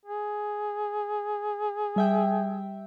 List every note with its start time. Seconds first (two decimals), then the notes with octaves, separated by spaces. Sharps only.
0.05 G#4
1.96 G3 E5 G5